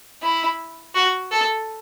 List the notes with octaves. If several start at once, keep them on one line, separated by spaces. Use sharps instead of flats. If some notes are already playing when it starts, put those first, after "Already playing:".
E4
F#4
A4